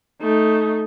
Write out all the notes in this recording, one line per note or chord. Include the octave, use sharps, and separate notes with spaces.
A3 D#4